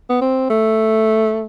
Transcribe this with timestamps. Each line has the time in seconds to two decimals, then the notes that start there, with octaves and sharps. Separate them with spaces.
0.09 B3
0.21 C4
0.50 A3